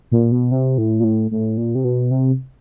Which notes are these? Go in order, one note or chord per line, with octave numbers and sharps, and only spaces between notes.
A#2
B2
C3
A2
A#2
A2
A2
A#2
C3
B2
C3